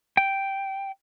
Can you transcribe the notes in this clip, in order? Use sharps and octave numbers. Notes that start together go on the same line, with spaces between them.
G5